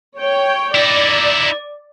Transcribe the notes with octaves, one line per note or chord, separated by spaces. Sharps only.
C#5 G5
D#4 E4 D5